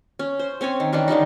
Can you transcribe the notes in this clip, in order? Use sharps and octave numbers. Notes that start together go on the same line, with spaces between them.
C#4
C5
C4 C#4 C#5 G#5
D#3
D#3 E3 C#4 D4
D3 D#3 G3 D#4